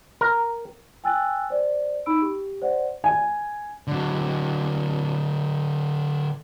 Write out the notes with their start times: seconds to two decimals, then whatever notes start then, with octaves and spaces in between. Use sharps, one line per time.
0.21 A#4
1.04 G5 G#5 E6 F#6 A6
1.50 C5 D5
2.06 D#4 B5 E6 D7
2.22 G4
2.62 C5 D5 F#5
3.04 G#5
3.88 D3 F#3